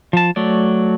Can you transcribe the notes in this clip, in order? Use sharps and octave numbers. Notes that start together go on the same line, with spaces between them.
F3 A5
F#3 A3 D5